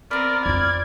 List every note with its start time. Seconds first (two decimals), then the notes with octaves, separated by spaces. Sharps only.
0.11 B3 C4 A#4 D5 F6
0.46 F2 F4 D5 G#6